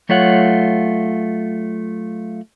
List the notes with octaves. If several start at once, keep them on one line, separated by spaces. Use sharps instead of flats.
F#3 A3 F4 C#5 F#5